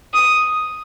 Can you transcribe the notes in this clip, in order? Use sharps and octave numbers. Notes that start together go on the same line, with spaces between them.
D#6